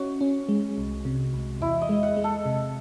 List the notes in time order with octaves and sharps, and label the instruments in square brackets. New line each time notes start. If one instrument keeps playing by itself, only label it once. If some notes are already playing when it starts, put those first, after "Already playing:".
Already playing: [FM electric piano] C#4 [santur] F#4
[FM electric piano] C#4
G#3
C2
C3
C2
[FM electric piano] E2 [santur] E4
[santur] D#5
[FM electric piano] G#3
[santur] F#5
[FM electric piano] G#3
[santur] A4
[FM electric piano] C3